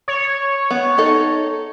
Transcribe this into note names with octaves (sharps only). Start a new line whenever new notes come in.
C#5
B3
D#4 A4